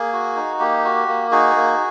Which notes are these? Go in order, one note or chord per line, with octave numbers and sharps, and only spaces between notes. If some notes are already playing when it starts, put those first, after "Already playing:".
Already playing: A#3 G#4
F#4
D#4
A#3 G4
F#4
A#3
D#4 F#4 G#4
A#3